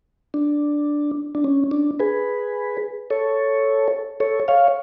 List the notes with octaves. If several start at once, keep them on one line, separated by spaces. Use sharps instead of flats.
D4
D4
C#4
D4
G#4 B4
A4 C#5
A4 C#5
C#5 F5